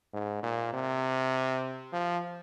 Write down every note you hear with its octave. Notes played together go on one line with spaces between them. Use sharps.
G#2
A#2
C3
F3